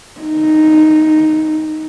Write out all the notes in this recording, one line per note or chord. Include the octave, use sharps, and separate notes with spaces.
D#4